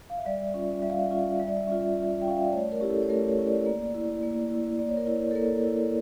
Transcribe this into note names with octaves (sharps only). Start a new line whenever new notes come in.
F5
E5
G3 D5
C#4 F4
G3 E5
F5
E5
C#4 F4
G3 E5
D5
E5
C#4 F4
G3
G5
C#4 F4 F5
E5
D5
A3 C#5
A#4
C#4 E4 G4
A4
C#5
A3 A#4
C#5
C#4 E4
D5
A#3
E4
A#3
E4
A#3 D5
C#5
A#4
E4 C#5
A4
A#3 A#4
E4